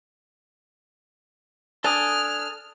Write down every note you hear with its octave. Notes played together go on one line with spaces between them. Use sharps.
D4 A4 G#5 D#6 F6